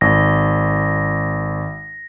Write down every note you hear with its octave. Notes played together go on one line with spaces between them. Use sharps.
G#1 A#6